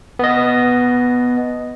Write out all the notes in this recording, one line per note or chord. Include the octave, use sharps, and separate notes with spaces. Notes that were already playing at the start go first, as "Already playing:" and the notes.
B3 D#5